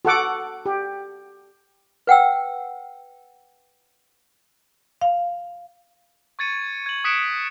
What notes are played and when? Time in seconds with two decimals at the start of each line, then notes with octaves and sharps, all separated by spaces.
0.05 F#4 A4 F#5 D6
0.66 G4
2.07 B4 F#5 G5 E6
5.01 F5
6.39 C#6 G#6 A6 C#7 D#7
6.86 G#6 F#7
7.04 D#6 F#6 B6 C#7 D7 E7